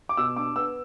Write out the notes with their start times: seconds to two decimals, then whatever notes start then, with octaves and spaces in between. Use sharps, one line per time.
0.09 D6
0.17 B2 E6
0.36 D4 D6
0.56 B3 E6